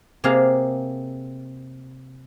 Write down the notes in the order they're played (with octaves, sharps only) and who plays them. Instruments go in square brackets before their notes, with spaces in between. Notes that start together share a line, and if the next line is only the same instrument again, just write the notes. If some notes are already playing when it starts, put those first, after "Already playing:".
[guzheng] C3 A#3 C4 G#4 F5